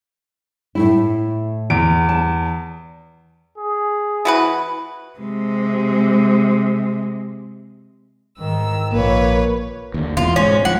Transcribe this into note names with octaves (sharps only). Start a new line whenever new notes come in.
A2 A3 E4
E2 D7
A5
G#4
E3 F#4 B4
C3 G#3
G#2 D#3 E6
A#1 A#3 B4 C#5
D#2 D3
E1 E2 B2 F4
G#2 C#4
D2 F3 F#5